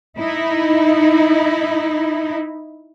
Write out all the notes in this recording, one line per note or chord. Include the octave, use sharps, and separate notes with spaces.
D#4 E4